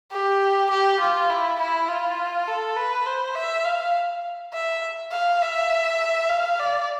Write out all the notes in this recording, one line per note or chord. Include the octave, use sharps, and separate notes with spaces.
G4
G4
F4
E4
E4
F4
A4
B4
C5
E5
F5
E5
F5
E5
F5
D5